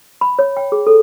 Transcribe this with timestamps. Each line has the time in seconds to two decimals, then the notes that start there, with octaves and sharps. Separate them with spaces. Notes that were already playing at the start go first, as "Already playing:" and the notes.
0.21 B5
0.39 C#5
0.57 G5
0.72 G#4
0.87 A4